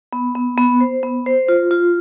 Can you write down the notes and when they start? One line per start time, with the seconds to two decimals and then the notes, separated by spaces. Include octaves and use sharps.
0.13 B3
0.35 B3
0.58 B3
0.80 C5
1.03 B3
1.26 C5
1.48 F4
1.71 F4